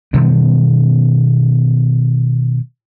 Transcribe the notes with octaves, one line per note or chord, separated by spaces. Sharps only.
B2 D#3 G3 B3